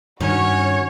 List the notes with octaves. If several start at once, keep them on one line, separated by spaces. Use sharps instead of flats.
G2 D#3 C#4 F#4 C#5